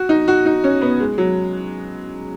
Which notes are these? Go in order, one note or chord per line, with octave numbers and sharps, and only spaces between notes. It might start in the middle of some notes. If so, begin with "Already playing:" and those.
Already playing: F#4
D#4
F#4
D#4
C#4
B3
G#3
F#3